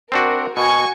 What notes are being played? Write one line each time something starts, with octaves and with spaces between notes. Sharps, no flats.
C4 D4 F#4 A#4
B2 F#4 G#5 C#6